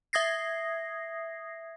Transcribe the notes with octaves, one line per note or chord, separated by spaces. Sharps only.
E5 D#6 G#6 A#6 C7